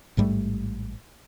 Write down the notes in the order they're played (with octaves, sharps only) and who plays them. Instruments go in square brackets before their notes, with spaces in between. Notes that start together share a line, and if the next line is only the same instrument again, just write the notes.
[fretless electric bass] A1 G#2 G3 A3